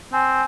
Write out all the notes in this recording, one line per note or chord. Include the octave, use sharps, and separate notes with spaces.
C4 G#5